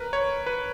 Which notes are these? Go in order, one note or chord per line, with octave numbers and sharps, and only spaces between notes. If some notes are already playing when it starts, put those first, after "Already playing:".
Already playing: A#4 B4
C#5
B4